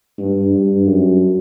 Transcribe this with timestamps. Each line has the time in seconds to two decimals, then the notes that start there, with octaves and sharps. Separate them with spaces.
0.18 G2
0.53 G2
0.87 F#2